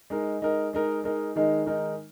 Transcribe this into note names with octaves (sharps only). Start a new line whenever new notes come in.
G#3 D#4 A#4
G#3 D#4 A#4
G#3 D#4 A#4
G#3 D#4 A#4
D#3 G#3 D#4 A#4
D#3 G#3 D#4 A#4